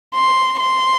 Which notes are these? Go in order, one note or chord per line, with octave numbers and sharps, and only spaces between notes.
C6
C6